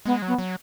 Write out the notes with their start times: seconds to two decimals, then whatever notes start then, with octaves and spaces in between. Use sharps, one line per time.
0.05 G#3 B3
0.22 F#3
0.27 B3
0.39 F#3